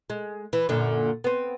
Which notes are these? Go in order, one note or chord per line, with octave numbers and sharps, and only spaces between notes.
G#3
E3
F#2 A#2 D3
B3 C4